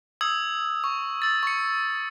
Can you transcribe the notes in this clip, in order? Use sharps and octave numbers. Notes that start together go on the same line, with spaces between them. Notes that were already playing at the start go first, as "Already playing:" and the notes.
D#6 E6 G#6 F#7
C#6
E6 A6
C#6 C#7